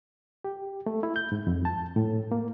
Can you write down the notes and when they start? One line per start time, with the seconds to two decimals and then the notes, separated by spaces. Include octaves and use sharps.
0.44 G4
0.86 A3
1.03 E4
1.16 G6
1.32 G#2
1.47 F2
1.65 A5
1.96 A2
2.32 A#3